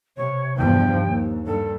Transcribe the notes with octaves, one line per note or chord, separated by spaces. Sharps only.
C3 C#5
E2 G2 F3 G5
D#2
G2 A4